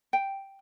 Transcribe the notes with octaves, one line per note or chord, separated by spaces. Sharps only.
G5